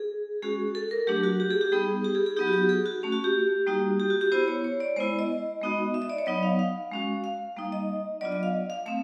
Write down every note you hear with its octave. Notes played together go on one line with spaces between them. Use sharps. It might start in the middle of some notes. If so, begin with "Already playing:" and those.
Already playing: G#4
G#3 C#4 F#4 G#4
A4
A#4
F#3 A3 D4 G4
F#4
G4
G#4
G4
G3 B3 D#4 G#4
G4
G#4
G#4
F#3 B3 D#4 G4
F#4
G4
G#4
F#4
A3 C#4 F#4
F#4
G4
G3 A#3 D#4 F#4
G4
F#4
G4
B3 E4 C5
C#5
C#5
D5
G#3 B3 E4 C5
D#5
G#3 B3 D#4 F#4
E5
D#5
D5
C#5
F#3 B3 D#4 D#5
F5
F5
G#3 C#4 F#4
F5
G3 A#3 D#4
D#5
F#3 B3 D4 F4 D5
D#5
F5
F5
A3 C4 F5